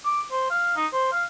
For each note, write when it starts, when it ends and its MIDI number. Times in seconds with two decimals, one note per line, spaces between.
0.05 0.22 86
0.31 0.45 72
0.50 0.75 77
0.76 0.86 63
0.93 1.08 72
1.12 1.24 77